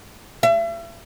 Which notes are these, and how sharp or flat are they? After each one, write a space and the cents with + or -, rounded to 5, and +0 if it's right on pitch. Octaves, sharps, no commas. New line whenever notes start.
E5 +40